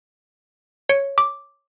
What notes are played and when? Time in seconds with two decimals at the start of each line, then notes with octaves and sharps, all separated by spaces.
0.89 C#5 C#7
1.18 D6